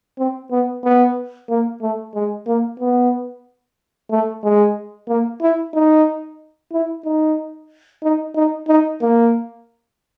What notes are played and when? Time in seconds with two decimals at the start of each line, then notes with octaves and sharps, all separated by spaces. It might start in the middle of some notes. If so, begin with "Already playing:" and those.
0.18 C4
0.51 B3
0.84 B3
1.49 A#3
1.82 A3
2.15 G#3
2.47 A#3
2.80 B3
4.11 A3
4.43 G#3
5.08 A#3
5.41 E4
5.74 D#4
6.72 E4
7.05 D#4
8.03 D#4
8.35 D#4
8.68 D#4
9.01 A#3